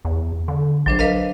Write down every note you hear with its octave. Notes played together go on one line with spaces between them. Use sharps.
E2
D3
A#1 F#3 D4 C5
A#4 B4 D#5 F5